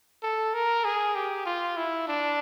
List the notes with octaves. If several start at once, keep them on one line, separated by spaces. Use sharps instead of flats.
A4
A#4
G#4
G4
F4
E4
D4